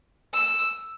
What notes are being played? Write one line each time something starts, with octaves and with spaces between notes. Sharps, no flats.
E6